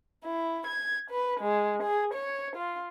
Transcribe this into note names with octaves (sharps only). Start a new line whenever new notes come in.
E4
G#6
B4
G#3
G#4
C#5
F4